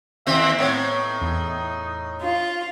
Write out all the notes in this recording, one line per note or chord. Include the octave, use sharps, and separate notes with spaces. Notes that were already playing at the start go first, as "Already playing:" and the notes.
D#2 C4 E5
A2 B3 C4 D#4 C#5
E2
F4